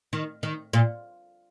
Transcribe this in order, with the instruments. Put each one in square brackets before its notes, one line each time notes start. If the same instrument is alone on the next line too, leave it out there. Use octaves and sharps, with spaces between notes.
[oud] D#3
D#3
A#2